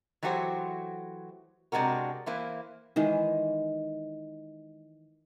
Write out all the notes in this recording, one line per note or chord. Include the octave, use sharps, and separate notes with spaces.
E3 F#3 A3 F#4 G4 C5
C3 G#3 D4 F#4 A#4
E3 A#3 E4 C5
D#3 E3 G#3